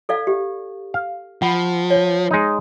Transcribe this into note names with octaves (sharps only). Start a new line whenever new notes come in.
A4 D5 F5
G4
F5
F3 F#5 B5
C#5
G#3 D#4